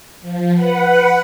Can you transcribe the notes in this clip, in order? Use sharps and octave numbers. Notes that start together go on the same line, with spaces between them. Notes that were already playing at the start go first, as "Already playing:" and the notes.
F3
B4 F#5